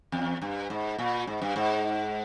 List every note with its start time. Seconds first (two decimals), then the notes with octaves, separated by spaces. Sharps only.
0.12 E2
0.42 G2
0.70 G#2
0.98 A#2
1.27 G#2
1.42 G2
1.56 G#2